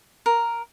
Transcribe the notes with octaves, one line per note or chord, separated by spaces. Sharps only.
A#4